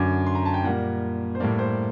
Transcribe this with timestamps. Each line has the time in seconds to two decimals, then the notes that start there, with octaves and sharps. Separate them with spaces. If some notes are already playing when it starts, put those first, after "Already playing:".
Already playing: F#2 D3 F#3 D6
0.26 C6
0.35 A#5
0.45 A5
0.54 G5
0.64 A#2 G3 A#3 F#5
1.35 C5
1.40 A2 G3 A#3 D5
1.59 C5